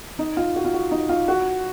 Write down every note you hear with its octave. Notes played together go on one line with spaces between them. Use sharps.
D#4
F4
F#4
F4
F#4
D#4
F4
F#4